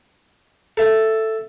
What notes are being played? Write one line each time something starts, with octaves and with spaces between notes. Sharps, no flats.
A4 E5